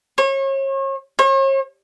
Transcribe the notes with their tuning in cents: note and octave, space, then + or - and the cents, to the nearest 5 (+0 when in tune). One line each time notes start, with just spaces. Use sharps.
C#5 -35
C#5 -45